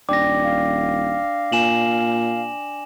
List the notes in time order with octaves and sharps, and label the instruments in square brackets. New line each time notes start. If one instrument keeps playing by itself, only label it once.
[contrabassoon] D#1 [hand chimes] D4 D5 G5 [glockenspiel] D6 A#6
[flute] F5
[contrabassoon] A#2 [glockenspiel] G#5 E7 F#7